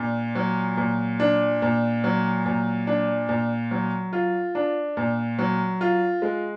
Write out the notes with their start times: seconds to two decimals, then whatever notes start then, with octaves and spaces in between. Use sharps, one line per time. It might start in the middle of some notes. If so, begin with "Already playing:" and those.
Already playing: A#2 D4
0.35 F#3
0.77 A#2
1.20 D4
1.62 A#2
2.04 F#3
2.46 A#2
2.87 D4
3.29 A#2
3.71 F#3
4.13 F4
4.55 D4
4.97 A#2
5.39 F#3
5.81 F4
6.22 G#3